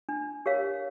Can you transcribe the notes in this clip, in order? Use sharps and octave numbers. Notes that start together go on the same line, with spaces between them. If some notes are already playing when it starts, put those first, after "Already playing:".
D4
G4 A#4 C#5 F5